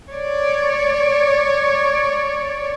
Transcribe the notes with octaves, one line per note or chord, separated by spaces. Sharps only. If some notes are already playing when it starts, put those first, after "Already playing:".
C#5 D5